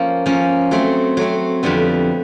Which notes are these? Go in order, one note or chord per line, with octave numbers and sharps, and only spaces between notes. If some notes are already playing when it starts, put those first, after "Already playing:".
Already playing: F3 A#3 C#4
F3 A#3 C#4
F#3 A3 C4
F#3 A3 C4
F2 D3 G3 B3